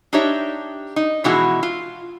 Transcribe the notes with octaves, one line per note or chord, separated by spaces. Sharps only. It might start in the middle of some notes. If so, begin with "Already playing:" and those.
D4 D#4 G4 C#5 E5
D#4
B2 E3 F3 G#3 E4 F#4
F4